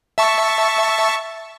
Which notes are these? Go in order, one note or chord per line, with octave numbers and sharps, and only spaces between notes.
E5 A5 C#6